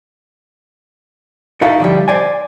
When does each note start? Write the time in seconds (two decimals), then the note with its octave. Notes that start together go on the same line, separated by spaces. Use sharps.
1.61 D#4 E4 F#4 A4 F5
1.80 D3 F3 G3
2.08 C5 D5 G#5